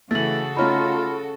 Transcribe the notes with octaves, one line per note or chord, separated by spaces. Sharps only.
C#3 E3 A3 F#4 A4 A6 F#7
A3 C#4 D#4 F4 B5 F6